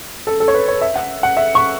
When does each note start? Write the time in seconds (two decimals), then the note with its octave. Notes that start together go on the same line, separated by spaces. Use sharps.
0.27 A4
0.40 A4
0.48 C#5
0.54 B4
0.68 C#5
0.81 E5
0.95 F#5
1.23 F#5
1.37 E5
1.55 C#6